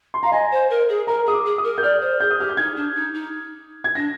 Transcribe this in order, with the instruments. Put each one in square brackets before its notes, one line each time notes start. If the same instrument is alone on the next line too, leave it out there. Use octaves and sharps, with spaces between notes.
[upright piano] C6
[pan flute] F5 [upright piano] A#5
[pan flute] D#5 [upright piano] G#5
[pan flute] C5
A#4
G#4
[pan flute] A#4 [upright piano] A#5
[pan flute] G#4 [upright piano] D#6
[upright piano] D6
[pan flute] G#4
[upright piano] D#6
[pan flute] A#4
[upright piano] G6
[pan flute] D5 [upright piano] F6
[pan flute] C5
[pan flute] G#4 [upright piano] G6
[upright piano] D#6
[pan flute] G4 [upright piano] F6
[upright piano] G6
[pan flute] D#4 [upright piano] G#6
[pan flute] D4
D#4
D#4
[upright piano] G#6
[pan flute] D4 [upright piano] A#6